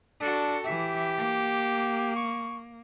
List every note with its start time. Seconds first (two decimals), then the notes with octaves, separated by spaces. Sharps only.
0.21 D4 F#4 A4
0.65 E3 G4 E5
1.18 A#3
2.16 C#6